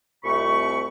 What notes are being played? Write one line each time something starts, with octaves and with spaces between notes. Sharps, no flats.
C2 F2 F3 A3 B5 C#6